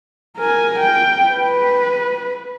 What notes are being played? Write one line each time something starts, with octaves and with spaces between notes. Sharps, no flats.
A#4 G#5
G5
B4